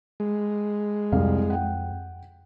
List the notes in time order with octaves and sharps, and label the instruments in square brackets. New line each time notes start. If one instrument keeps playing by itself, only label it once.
[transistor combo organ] G#3
[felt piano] C2 F5 [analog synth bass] F2
[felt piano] F#5 G5